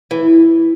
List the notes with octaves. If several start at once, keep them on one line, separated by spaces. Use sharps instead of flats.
E3